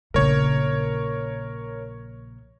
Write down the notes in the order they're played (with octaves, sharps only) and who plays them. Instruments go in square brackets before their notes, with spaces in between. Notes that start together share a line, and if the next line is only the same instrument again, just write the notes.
[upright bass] A#1 C#3 [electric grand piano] A#4 C#5